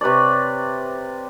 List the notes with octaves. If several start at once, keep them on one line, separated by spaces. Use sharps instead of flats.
C3 B4 C#5 D5